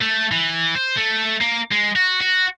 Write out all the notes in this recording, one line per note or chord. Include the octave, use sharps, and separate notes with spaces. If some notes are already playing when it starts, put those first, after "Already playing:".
A3
E3
C5
A3
A#3
G#3
F#4
F#4